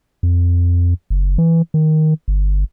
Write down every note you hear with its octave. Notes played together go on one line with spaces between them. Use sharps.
F2
F#1
E3
D#3
G1